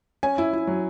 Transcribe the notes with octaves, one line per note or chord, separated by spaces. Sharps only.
C#4 G#5
E4
E4
F#3